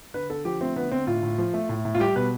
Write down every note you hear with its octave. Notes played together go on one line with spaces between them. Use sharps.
D3 B4
D3 A4
F3 G4
A3 C4
D3 B3
D3 C4
A2 F4
A2
F3
A3
A2
A2
F4
G3 G4
B2 B4